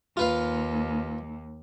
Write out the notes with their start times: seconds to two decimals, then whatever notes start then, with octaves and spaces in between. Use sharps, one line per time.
0.17 D#2 F4 B4 F5